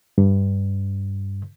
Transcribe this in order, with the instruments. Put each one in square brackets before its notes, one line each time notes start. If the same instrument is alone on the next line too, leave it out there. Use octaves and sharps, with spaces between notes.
[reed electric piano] G2